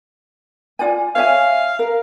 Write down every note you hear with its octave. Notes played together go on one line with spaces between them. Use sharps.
F4 D5 G#5
C#5 E5 F5 G#5
A#4